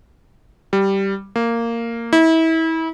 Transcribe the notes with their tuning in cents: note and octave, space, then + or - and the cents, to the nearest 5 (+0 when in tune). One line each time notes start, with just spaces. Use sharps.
G3 -5
A#3 -10
E4 -30